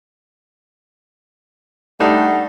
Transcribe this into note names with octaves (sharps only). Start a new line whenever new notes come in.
G3 A3 D4 D#4 F#5